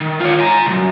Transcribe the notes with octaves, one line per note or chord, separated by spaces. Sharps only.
D#3
F4 C#5
G#5 A#5
C2 F#2